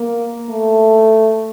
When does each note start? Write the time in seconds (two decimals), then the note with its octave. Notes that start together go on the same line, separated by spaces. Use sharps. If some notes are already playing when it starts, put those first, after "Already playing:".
Already playing: A#3
0.50 A3